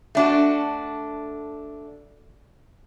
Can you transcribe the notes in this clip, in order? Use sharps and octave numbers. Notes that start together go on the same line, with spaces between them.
A3 D4 F#4